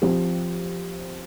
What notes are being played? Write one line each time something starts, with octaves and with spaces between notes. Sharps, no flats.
F3 C4 G4